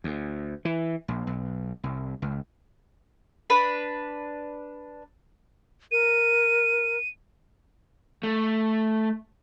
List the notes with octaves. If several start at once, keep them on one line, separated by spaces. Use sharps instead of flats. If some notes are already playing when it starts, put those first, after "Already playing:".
D2
E3
A#1
B1
C2
C#2
D4 B4 B5
A#4 D#7
A3